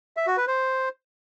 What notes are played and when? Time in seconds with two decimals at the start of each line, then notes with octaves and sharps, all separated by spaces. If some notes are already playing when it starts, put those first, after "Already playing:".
0.17 E5
0.27 F#4
0.37 B4
0.47 C5